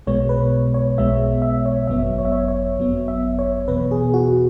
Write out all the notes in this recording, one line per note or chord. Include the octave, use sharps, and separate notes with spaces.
B1 B2 G#3 B3 C#5
B4
C#5
B1 B2 G#3 B3 E5
E5
C#5
G#1 F#2 F#3 B3 E5
C#5
E5
C#5
C#5
G#1 F#2 F#3 B3
E5
C#5
E2 B2 B3 B4
G#4
F#4